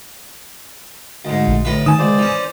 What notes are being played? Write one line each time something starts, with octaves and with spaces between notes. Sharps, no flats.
D2 G#2 G#3
A#1
D2 A2 B4
D#3 G#5 A5 D#6
C#2 C5 D5
E3 C#4